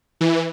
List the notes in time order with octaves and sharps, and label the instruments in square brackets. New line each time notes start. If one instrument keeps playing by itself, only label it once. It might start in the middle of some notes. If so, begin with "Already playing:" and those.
[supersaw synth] E3